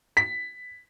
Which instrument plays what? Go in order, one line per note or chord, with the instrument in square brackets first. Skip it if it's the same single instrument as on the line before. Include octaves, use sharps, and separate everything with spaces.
[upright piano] B6